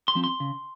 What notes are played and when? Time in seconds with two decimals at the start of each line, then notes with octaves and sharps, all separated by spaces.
0.08 C6
0.15 F3 C4
0.24 C6
0.40 C#3